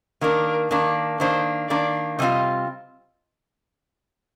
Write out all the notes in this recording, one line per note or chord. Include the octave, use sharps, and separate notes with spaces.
D#3 A#3 D4 A#4
D#3 A#3 D4
D#3 A#3 D4 C5
D#3 A#3 D4 D5
C3 G3 C4 F4 D#5